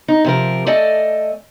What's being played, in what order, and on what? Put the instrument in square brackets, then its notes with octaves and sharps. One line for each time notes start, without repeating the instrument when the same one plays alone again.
[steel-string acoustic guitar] D#4
C3 F3 A#4
A3 A4 D5 D#5 G#5